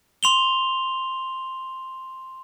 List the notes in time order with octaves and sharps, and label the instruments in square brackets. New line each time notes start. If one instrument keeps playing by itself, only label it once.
[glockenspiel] C6 F7 G7